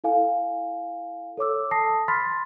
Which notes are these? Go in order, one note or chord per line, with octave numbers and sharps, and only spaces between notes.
E4 A4 F5 G#5
A4 C#5 D6 E6
A5 D#6 A#6 C7
B5 C6 F6 A6 B6